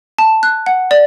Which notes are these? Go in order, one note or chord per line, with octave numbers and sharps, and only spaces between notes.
A5
F#6
F#5
D5